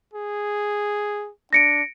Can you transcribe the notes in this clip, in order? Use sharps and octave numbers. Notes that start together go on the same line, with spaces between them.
G#4
D4 A#6 C#7 D7